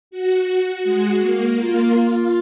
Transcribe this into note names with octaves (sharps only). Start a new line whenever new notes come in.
F#4
G#3
A#3
F4
F4